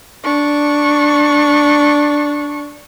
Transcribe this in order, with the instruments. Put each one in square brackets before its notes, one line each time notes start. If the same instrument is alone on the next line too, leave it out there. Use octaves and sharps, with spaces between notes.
[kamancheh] D4 C#6